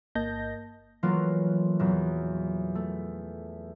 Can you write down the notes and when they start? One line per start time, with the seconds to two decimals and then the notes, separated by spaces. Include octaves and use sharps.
0.15 G1 A#3 D#5 A5 G6 A#6
1.03 E3 F#3 A3 A#3 F4 F#4
1.79 E2 A#2 F#3
2.75 A3